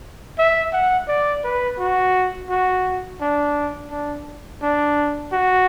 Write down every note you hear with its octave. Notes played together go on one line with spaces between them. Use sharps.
E5
F#5
D5
B4
F#4
F#4
D4
D4
D4
F#4